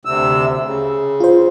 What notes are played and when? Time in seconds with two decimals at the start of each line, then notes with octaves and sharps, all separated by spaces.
0.05 D2 C3 E6
0.64 C#3
1.20 F4 C5